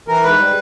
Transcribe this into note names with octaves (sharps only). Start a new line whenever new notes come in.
E3 A#4
G#2 B4
G3